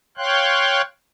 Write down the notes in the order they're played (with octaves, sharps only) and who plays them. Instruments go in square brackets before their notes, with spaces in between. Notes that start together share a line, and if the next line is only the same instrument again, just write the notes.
[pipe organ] C#5 F5 G5 C6 F#6